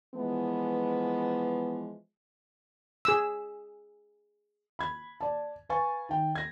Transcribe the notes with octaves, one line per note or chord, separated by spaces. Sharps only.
E3 F3 G#3 B3
G#4 E6
B5 G#6
D5 A5
B4 F5 G#5 C#6 A6
D#3 G5
G#6 A#6